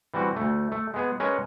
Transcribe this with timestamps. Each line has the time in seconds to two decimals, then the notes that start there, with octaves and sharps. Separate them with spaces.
0.14 E3 G3 C4 F#4
0.36 D2 A3
0.72 A3
0.94 G#3 B3 G#4
1.20 G#3 C#4 A#4 B4 C#5